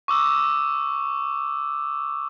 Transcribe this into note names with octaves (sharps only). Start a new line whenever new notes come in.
C#6 D6 E6